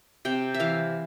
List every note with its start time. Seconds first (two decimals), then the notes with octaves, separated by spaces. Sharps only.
0.25 C3 G5
0.54 E5
0.60 E3 F5